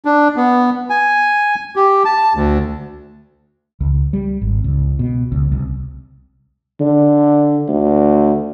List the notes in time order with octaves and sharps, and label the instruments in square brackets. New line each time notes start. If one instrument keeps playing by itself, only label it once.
[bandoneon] D4
B3
G#5
G4
A5
D2
[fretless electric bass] C#2
G3
G#1
C#2
B2
C#2
C2
[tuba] D3
D2